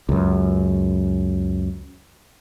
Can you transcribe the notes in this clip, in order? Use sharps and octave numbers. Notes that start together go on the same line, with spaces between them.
C#2 F#2